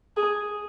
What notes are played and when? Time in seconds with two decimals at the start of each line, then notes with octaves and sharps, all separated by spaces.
0.17 G#4